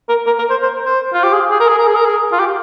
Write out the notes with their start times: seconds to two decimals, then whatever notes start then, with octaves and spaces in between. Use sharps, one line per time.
0.09 A#4
0.26 A#4
0.38 A#4
0.50 C5
0.63 C5
0.85 C5
1.13 F4
1.23 G4
1.33 G#4
1.50 G#4
1.60 A#4
1.68 G#4
1.78 A#4
1.87 G#4
1.96 A#4
2.05 G#4
2.32 F4
2.39 G4